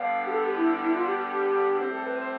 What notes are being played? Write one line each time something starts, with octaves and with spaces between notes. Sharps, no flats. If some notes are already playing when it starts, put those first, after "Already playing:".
Already playing: D3 G3 B3 F5
G4
A4
G4
E4
E4
F4
G4
G4
G4
A2 G3 C4 G4
A4
B4
C5